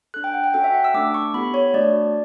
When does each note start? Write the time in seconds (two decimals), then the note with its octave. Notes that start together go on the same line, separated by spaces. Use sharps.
0.14 D4 A4 F#6
0.24 G5
0.34 F#5
0.44 G5
0.54 C#4 F#4 A4 G5
0.64 E5
0.74 F#5
0.84 E6
0.94 A3 D4 A4 D6
1.14 C#6
1.34 B3 E4 G4 B5
1.54 C#5
1.74 A3 D4 F#4 D5